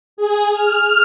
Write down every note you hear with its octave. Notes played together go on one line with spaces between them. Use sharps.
G#4
F6